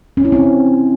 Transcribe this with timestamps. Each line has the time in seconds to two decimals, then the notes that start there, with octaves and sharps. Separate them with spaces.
0.17 C#4
0.25 E4
0.32 C4